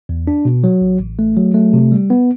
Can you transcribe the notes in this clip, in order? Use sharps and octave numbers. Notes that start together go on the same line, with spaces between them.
E2
D4
B2
F#3
A1
A1
A3
F#3
A3
C3
G3
B3